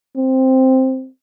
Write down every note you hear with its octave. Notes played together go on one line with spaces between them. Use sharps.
C4